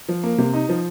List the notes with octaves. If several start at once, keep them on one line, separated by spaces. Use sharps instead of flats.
F3
A#3
C3
D#4
F3